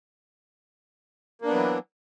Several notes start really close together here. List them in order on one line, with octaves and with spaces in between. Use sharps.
A#3 D4 B3 F#3 E3